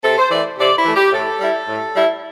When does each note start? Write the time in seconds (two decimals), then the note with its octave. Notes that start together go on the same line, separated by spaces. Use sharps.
0.03 C3 A4
0.18 C5
0.31 E3 A3 D5
0.59 C3 D5
0.77 E4
0.85 E3 A3
0.95 G4
1.12 A2 A4
1.40 G3 E4
1.68 A2
1.94 G3 E4